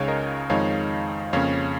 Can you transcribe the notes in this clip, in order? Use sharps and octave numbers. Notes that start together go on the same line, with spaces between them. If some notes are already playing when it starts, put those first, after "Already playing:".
Already playing: C#2 C#3 G#3 D#4 C#5 F5 G#5
A#4 D#5
F2 D#3 G#3 D#4 C#5 F5
F2 C#3 A#3 C#4 C#5 F5